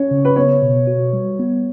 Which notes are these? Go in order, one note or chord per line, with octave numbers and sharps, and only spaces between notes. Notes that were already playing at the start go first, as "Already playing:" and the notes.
Already playing: C#4 C#5
C#3
B4
B3 C#5
B2
F#4
G3
B3